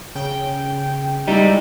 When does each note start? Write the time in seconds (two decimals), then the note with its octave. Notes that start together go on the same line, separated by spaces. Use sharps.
0.15 C#3 G5
1.28 G3 G#3 D#4 E4 G4